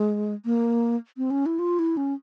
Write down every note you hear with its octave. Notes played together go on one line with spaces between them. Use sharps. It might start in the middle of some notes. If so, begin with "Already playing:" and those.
Already playing: G#3
A#3
C4
C#4
E4
F4
E4
C#4